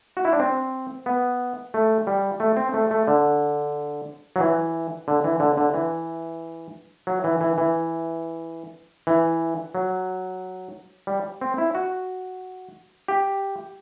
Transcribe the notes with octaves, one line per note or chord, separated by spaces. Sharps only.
F#4
E4
D4
C4
B3
A3
G3
A3
C4
A3
A3
D3
F#3
E3
D3
E3
D3
D3
E3
F#3
E3
E3
E3
E3
F#3
G3
C4
E4
F#4
G4